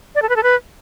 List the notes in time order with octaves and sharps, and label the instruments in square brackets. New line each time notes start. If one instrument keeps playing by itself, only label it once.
[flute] D5
A4
B4
A4
B4